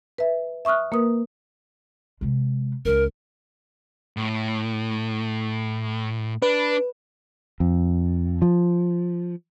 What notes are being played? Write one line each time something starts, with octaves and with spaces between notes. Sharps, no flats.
B4 E5
E5 C#6 D#6 F6 F#6
A#3 A#4 B4 D#6
C3 G#3
C#2 A#4
A2
D4 B4
F2
F3